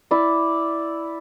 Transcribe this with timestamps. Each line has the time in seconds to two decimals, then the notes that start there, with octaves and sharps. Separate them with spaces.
0.11 E4 D5